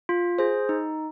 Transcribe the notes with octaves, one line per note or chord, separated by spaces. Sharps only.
F4
G#4 C5
D#4